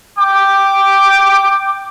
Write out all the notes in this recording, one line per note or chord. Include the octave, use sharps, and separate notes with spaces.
G5 D6